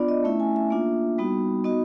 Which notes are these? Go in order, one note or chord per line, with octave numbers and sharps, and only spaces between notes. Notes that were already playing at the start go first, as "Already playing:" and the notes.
Already playing: B3 D4 F4 D5
D#5
A3 C#4 E4 E5
G#5
E5
A#3 D4 F4
G3 B3 D#4 F#4
B3 D#4 F#4 D#5